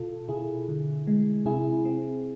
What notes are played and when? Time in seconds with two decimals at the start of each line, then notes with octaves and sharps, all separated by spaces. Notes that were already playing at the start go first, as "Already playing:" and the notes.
Already playing: B2 F4 A4
0.28 B2 E4 G#4
0.69 D3
1.07 G#3
1.46 C3 E4 G#4
1.85 C4